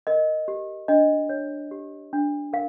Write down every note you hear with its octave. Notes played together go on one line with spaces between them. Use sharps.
A#4 D#5
G4
D4 D#5
C#5
G4
D4
A#4 F5